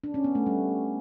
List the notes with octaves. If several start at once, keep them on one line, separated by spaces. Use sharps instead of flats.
D4
C#4
B3
A3
G3